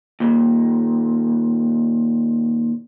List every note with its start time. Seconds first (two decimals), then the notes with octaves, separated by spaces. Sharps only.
0.20 D#2 A#2